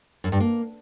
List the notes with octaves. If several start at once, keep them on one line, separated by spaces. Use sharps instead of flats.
F#2
G2
A#3